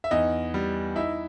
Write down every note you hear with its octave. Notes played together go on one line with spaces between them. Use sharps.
E5
E2 D#4 D#5
G3
D#4 E4 E5